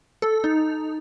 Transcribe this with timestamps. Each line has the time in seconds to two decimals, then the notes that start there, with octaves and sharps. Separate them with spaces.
0.22 A4
0.44 D#4